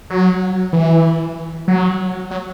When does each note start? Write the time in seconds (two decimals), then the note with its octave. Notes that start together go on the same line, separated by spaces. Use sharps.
0.10 F#3
0.73 E3
1.68 F#3
2.31 F#3